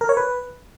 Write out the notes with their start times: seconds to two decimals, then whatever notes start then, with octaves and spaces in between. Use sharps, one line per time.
0.01 A#4
0.09 C#5
0.17 B4